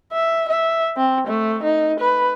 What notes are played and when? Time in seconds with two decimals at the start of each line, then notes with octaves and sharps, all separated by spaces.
0.13 E5
0.48 E5
0.97 C4
1.27 A3
1.63 D#4
2.00 B4